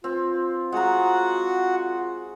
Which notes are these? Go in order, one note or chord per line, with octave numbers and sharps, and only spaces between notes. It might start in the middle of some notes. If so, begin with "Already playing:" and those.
C4 F4
G#3 F#4 F#5 A#5